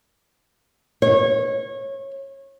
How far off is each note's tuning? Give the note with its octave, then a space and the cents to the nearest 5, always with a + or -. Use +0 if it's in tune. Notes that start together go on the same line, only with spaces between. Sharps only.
C#5 -25